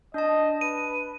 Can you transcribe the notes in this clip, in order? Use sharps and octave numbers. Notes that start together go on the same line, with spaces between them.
D4 D#5 A5
B4 D#7